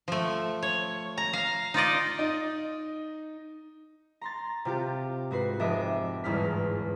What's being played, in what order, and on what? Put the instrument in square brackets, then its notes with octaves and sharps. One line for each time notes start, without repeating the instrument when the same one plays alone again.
[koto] F3 A3
C#5
A#5
F5
D#4 F4 D5 D#5
[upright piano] D#4
[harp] A#5 C6 A6
C3 F4 G4
G#2 F#4 B4 C7
F1 D#5 E5 D6
G1 E2 G#2 F6 B6